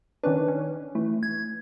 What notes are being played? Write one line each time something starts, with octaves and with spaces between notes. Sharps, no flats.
D#3 C#4 D4 B4
C#4
E3 A3
G#6